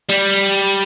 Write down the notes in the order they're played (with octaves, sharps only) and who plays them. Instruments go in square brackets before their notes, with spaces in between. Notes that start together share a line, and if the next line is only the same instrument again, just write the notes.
[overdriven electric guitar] G3